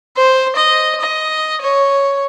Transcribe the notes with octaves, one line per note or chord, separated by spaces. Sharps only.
C5
D#5
D#5
C#5